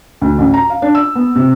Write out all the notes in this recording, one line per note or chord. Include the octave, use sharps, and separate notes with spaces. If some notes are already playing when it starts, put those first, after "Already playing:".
D2
A1
A#5
F5
D4
E6
B3
C3